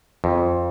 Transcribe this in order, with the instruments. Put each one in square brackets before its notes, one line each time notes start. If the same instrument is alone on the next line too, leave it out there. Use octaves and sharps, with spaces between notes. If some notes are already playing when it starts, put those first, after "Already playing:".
[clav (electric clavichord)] F2